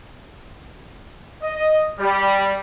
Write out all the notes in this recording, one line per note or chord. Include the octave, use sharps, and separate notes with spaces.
D#5
G3